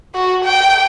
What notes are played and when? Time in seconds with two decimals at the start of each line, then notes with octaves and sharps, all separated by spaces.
0.15 F#4
0.45 G5